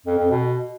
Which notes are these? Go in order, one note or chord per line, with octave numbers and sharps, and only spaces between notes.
F2
F2
B2